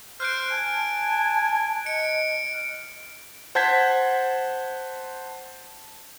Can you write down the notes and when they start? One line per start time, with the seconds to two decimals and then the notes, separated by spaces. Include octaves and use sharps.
0.20 C5 F6 F#6 D7
0.51 G#5 A5
1.86 D#5 C#7 D7
3.55 C5 F#5 A5 G6 G#6 B6